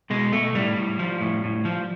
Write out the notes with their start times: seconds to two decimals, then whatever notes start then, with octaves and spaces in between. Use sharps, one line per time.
0.10 B2 G#3
0.32 B2 A3
0.55 A2 G3
0.77 A2
0.99 F3
1.21 A2
1.44 A2
1.65 F3